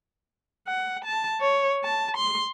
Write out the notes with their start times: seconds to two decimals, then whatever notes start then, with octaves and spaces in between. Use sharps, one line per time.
0.67 F#5
1.04 A5
1.41 C#5
1.84 A5
2.17 C6